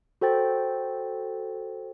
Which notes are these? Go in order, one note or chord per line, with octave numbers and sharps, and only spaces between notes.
F#4 A4 C5 G5 A6